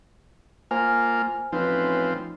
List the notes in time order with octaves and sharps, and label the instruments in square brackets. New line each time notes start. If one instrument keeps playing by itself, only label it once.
[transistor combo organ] A#3 F4 [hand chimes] C5 G#5 F6
[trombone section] A1 C#4 B4 [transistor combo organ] F3 C4 [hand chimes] D#4